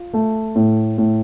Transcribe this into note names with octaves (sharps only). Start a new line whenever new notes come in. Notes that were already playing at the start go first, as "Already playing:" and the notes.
Already playing: F4
A3
A2
A2